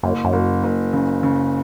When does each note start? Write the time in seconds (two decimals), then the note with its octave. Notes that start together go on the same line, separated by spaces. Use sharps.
0.03 F#1 F#2
0.25 F#2
0.33 F#1
0.64 F#1
0.93 C#3
1.23 C#3